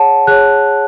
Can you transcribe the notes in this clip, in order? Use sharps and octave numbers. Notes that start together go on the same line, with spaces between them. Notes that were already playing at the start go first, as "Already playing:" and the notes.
Already playing: G#4 C#5 F#5 A5
G#4 C#5 F#6